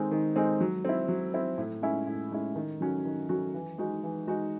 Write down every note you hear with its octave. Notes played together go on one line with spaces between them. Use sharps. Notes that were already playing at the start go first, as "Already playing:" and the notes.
Already playing: D#3 G#3 C4 D#4
D#3
G#3 C4 D#4
F#3
C4 E4
F#3
C4 E4
A2
G#3 C#4 E4
A2
G#3 C#4 E4
D#3
F#3 C#4 F#4
D#3
F#3 C#4 F#4
E3
G#3 D#4 F#4
E3
G#3 D#4 F#4